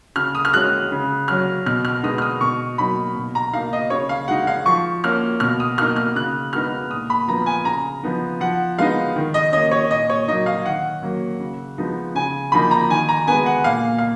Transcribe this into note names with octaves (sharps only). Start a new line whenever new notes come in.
C#3 F6
D#6
F6
G#3 C#4 F#6
C#3
F#3 C#4 F6
B2 F6
F6
G#3 B3 D#4 D#6
F6
D#6
B2 C#6
F#3 A#3 D#4 B5
B2
A#5
A#3 D#4 F5
D#5
C#3 C#5
F5
G#3 D#4 F#5
F5
F3 C#6
A#3 C#4 F6
B2 F6
D#6
A#3 D#4 F6
F6
C#3 F#6
G#3 B3 D#4 F6
A#2 D#6
B5
F3 B3 A#5
G#5
C#3 A#5
F3 B3 D#4
F3 F#5
G#3 B3 D#4 F5
D#3
D#5
A#3 C#4 D#5
C#5
A#2 D#5
C#5
F#3 A#3 D#4 D#5
F5
D#3 F#5
F#3 A#3 C#4
C#3
F3 G#3 B3 D#4
C#3 G#5
F3 A#3 D#4 B5
A#5
D#3 G#5
A#5
G#3 B3 G#5
F#5
A#2 F5
F5